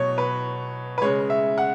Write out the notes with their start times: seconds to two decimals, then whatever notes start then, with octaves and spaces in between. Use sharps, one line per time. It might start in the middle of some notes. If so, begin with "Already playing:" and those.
Already playing: B2 F#3 C#5
0.18 B4
0.98 B4
1.02 C#3 G#3 C#5
1.30 E5
1.58 F#5